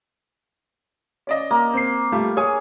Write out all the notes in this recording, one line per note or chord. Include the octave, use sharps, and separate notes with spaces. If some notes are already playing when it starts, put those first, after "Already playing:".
C#4 D5 D#5
A#3
C4 C7
G3 A3 F4
G#4 C#5 G#5 D#6